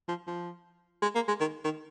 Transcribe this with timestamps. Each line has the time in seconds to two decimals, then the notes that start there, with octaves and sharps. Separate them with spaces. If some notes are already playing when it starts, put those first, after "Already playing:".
0.08 F3
0.27 F3
1.02 G#3
1.15 A#3
1.28 G#3
1.40 D#3
1.64 D#3